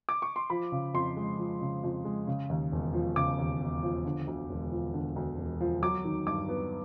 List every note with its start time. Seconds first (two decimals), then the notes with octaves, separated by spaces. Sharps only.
0.09 D6
0.22 C#6
0.36 C6
0.50 F3 B5
0.72 C#3
0.94 F2 C6
1.17 G#3
1.39 F3
1.61 C#3
1.83 F2
2.05 G#3
2.27 C#3
2.50 D#2
2.72 E1
2.94 F3
3.16 C#3 D6
3.38 D#2
3.61 E1
3.83 F3
4.06 D3
4.27 D2
4.49 E1
4.72 F3
4.94 D3
5.16 D2
5.38 E1
5.61 F3
5.82 F#3 D6
6.05 D#3
6.27 G2 D6
6.49 B3